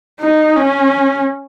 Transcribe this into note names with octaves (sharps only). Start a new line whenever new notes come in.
D#4
C#4